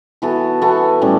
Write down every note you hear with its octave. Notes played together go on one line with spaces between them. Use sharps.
E3 B3 F#4 A4
E3 B3 F#4 A4
A2 G3 C#4